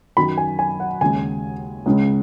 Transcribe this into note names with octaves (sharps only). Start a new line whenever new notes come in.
F#2 D#3 F#3 B5
G#5
G#5
F#5
D#2 C#3 G#3 G#5
C#2 C#3 G#3